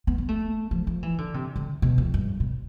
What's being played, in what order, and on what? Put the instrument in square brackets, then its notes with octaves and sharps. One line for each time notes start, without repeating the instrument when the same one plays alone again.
[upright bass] B3
B3
A3
F3
F3
E3
D3
C3
D3
B2
F2
G2
B2